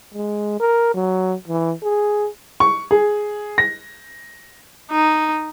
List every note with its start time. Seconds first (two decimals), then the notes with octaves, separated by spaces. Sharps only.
0.14 G#3
0.60 A#4
0.94 F#3
1.48 E3
1.83 G#4
2.60 C#6
2.91 G#4
3.58 A#6
4.91 D#4